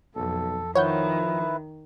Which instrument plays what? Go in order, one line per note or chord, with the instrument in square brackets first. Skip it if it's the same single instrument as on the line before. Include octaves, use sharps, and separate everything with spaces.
[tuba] B1 [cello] F2 [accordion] A4
[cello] D#3 [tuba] F3 [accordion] E4 B4 [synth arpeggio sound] C#5 F#5 G6